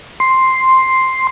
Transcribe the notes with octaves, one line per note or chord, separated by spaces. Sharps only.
C6